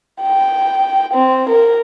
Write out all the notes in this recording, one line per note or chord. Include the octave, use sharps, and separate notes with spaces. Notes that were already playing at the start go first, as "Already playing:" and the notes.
G5
C4
A#4